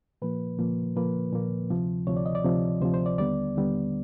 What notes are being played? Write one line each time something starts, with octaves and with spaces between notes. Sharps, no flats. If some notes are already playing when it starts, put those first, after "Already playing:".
A#2 F3 A#3 B4
A#2 F3 A#3
A#2 F3 A#3 B4
A#2 F3 A#3
D2 C3 F3
D2 C3 F3 C#5
D5
D#5
D5
D2 C3 F3
D2 C3 F3 C5
C5
D5
D#2 D3 G3 B3 D5
D#2 D3 G3 B3